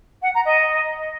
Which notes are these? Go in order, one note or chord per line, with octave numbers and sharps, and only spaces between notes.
F#5
A#5
D#5